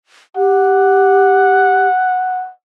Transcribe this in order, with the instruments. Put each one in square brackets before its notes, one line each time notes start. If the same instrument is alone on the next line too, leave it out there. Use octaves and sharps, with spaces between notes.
[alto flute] G4 [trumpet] F#5